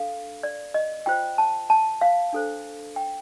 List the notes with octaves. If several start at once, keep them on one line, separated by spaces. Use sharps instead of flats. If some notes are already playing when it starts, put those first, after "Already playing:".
Already playing: D4 A4 F5
D5
D#5
F4 C5 G5
A5
A5
F5
D4 A4 C5
G5